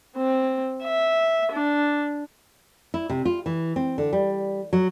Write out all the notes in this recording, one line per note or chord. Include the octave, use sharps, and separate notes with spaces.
C4
E5
D4
E4
C3
F4
E3
C4
D3
G3
F#3